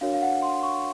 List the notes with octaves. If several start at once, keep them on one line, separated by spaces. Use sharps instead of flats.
D4 F#4 A#4 C#5 F5
F5
F#5
C6
C#6